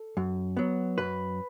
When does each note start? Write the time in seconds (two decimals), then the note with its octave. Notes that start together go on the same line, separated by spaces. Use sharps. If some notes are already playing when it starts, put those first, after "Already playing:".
Already playing: A4
0.17 F#2
0.57 F#3 B3
0.98 F#2 B4